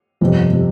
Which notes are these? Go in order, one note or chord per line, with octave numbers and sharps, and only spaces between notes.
G1 F2 C3
C3